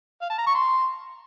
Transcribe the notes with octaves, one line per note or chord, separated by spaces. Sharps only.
F5
A5
A#5
C#6
C6